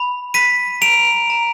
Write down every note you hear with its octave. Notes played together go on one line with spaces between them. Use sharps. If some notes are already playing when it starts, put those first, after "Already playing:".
Already playing: B5
B5 B6 D#7
A#5 D7 F7
A#5